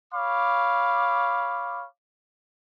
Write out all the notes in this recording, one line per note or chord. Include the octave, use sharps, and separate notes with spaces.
C#5 F5 B5 D6